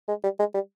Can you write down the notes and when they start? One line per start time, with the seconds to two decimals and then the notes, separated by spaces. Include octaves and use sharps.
0.08 G#3
0.24 G3
0.39 G#3
0.54 G3